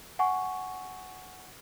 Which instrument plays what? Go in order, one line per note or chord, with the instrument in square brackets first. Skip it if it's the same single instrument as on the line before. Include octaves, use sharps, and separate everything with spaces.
[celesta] F#5 G#5 C#6